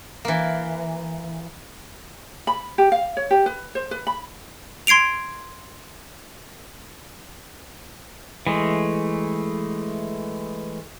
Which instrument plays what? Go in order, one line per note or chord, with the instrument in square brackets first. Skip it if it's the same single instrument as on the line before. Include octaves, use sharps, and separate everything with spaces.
[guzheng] E3 A#3
[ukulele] B5
G4
F5
C#5
G4
B4
C5
B4
B5
[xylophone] C6 G#6 C7 D7 F7
[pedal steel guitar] E3 G#3 A3